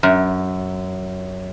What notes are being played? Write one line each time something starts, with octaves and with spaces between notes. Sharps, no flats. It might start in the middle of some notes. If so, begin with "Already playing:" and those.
F#2